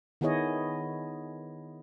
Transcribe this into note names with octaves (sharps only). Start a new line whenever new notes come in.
D#3 B3 E4 G#4 C#5 D#5